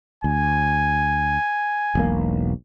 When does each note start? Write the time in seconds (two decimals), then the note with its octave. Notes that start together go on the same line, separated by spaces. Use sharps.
0.24 D2 G#5
1.95 E1 B1 A#3